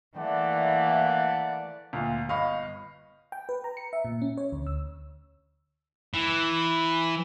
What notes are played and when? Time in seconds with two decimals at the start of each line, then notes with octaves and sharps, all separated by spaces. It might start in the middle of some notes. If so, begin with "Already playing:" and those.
0.17 E3 A3 A#3 D5 F#5
1.93 D2 A#2 F5
2.29 G1 D#5 F5 B5 C#6
3.32 G5
3.49 B4
3.64 A#5
3.77 C#7
3.93 E5
4.05 A#2
4.22 C#4
4.37 C#5
4.52 D2
4.67 E6
6.14 E3